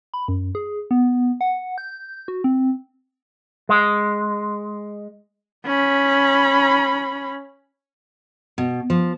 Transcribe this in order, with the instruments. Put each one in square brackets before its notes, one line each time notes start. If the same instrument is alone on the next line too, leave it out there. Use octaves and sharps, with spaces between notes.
[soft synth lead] B5
F#2
G#4
B3
F#5
G6
F#4
C4
[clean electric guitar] G#3
[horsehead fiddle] C#4 B5
[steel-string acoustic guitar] B2
F3